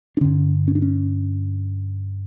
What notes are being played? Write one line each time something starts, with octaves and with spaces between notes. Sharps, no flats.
D4
G2 D3 C#4
C#4
D4
C#4